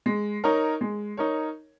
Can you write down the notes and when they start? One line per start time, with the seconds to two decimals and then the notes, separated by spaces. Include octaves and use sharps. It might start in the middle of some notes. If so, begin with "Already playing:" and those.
0.06 G#3
0.44 D#4 A#4 C#5
0.81 G#3
1.17 D#4 A#4 C#5